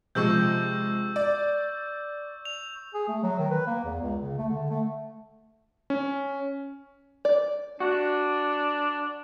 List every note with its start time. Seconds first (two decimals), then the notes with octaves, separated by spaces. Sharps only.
0.15 C3 F3 G#3 C#6 E6 G6
1.16 D5
2.45 F7
2.94 G#4
3.08 A3
3.23 F#3
3.39 D#3
3.50 B4
3.67 A#3
3.84 E2
4.01 C#2
4.22 C#3
4.38 A3
4.49 D3
4.70 A3
5.90 C#4
7.25 D5
7.80 D4 F#4